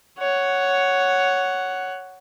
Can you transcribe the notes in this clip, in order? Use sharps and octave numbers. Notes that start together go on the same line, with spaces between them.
C#5 F#5